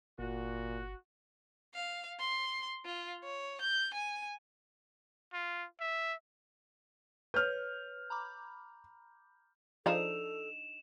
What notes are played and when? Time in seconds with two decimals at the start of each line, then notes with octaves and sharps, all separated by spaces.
0.19 G1 A#2 F#4
1.75 F5
2.20 C6
2.85 F4
3.25 C#5
3.61 G6
3.94 G#5
5.33 F4
5.80 E5
7.34 B4 C#5 F6 G6
8.10 A#5 B5 D6
9.86 F3 D4 D#4 G#4 A4 E7 F7